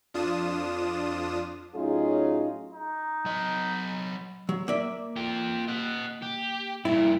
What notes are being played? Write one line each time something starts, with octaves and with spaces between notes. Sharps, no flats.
F2 D4 F4 D#6 E7
A2 F#3 C#4 D#4 F4 G#4
D#4
F#3 D#5
F#3
A#3 D5 E5
F4 G5
D#5 F#5
G4
G2 A#2 E4